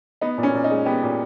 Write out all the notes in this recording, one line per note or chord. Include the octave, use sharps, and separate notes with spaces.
B3 D#4
A#2
C#4
A#2
D#4
G#3
B3 G4
A#2